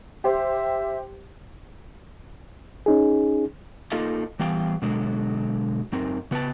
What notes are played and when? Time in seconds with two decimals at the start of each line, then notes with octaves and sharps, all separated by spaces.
0.24 G4 C5 E5
2.86 C#4 D#4 G#4
3.92 A#3 D#4 F4 A4 D#5 F5
4.39 E3 G3 B3 F5 G5
4.82 B2 D3 F#3 G#3
5.92 F#2 C4 D#4 A#4
6.31 C#3 B3 B4 C5 G5 A5